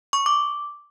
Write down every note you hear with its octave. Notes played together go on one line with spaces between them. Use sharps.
C#6
D6